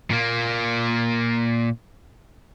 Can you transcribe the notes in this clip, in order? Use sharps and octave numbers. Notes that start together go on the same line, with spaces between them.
A#2 A#3